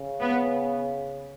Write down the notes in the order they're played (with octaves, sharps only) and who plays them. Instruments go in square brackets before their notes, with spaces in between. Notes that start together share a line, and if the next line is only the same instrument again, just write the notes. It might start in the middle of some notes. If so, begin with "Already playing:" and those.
Already playing: [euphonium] C#3
[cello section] B3